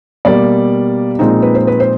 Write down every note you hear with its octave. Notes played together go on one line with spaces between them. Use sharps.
B2 G3 A#3 D5
A#2 F3 G#3 C4 D#4
B4
C5
B4
C5